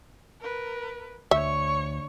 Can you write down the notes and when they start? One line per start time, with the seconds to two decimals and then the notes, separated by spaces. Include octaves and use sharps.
0.41 A#4 B4
1.31 D2 C#5 E5 C#6